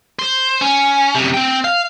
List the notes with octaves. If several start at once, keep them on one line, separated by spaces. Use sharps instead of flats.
C5
C#4
F#2 C3
C4 G5
F5